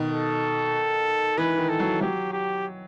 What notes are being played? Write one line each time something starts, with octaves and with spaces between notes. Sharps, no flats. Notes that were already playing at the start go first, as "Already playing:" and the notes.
Already playing: B2 D#3
A4
E3 B4
D#3
A4
F#3
F#3 G4
G4